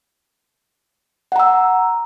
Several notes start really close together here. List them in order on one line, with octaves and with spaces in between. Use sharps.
F#5 A#5 E6